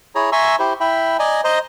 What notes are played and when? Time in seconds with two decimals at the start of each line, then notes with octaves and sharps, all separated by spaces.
0.15 E4 G#4 C#5 A#5
0.32 E5 G#5 A#5 C6 C#6 E6
0.59 E4 G4 C5
0.80 E4 E5 G5 B5
1.19 D5 D#5 G#5 A#5
1.44 C5 D#5 A#5